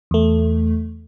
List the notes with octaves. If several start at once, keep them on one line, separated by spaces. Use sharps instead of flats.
E2 A3